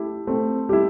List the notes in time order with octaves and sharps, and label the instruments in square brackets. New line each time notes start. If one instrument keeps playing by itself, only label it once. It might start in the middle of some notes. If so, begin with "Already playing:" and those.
Already playing: [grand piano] A3 E4 G4
[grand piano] A3 [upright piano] C4
[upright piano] G3 [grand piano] E4 G4